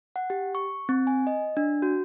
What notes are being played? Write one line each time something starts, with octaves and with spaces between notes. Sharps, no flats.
F#5
G4
C#6
C4
G#5
D#5
D4
F#4